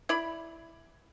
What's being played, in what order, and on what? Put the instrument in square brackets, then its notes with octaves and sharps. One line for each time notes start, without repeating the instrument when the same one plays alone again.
[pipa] E4 D5 B5